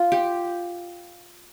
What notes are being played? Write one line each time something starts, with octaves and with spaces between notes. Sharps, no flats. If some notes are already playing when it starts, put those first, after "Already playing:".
Already playing: F4
G4